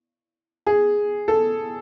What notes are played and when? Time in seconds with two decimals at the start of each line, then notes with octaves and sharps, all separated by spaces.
0.67 G#4
1.28 A4